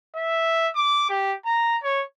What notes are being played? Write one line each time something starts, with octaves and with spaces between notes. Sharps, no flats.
E5
D6
G4
A#5
C#5